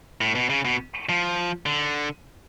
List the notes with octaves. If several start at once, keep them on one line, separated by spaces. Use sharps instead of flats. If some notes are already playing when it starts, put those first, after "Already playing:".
A2
B2
C#3
B2
F3
D3